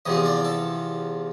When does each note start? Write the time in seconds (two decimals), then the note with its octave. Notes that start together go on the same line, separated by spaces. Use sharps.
0.06 E2 C3 F3 D#5
0.25 D5
0.45 A4